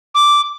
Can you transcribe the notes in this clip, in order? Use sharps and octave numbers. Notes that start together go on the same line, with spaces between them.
D6